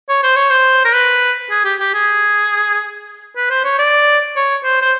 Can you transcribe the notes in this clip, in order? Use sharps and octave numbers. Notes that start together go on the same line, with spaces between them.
C#5
C5
C#5
C5
A#4
B4
G#4
G4
G4
G#4
B4
C5
C#5
D5
C#5
C5
C5